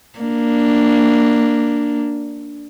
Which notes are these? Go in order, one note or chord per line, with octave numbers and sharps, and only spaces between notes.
A#3 D4